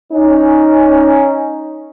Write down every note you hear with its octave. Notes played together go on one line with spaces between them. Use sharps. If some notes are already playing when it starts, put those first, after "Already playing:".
C#4 D#4